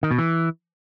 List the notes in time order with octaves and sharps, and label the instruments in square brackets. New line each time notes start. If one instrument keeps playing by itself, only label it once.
[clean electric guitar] D#3
B2
E3